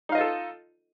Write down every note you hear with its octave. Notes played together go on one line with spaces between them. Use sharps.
D#4 F4 A4 D#5 F5